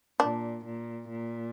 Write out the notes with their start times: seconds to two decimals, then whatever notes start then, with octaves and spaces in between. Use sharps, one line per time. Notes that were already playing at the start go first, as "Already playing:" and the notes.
0.19 A#2 D4
0.65 A#2
1.09 A#2